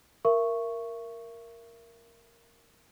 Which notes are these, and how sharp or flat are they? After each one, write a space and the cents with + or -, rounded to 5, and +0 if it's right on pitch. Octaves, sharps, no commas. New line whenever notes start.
A#4 +0 E5 +30 C#6 +0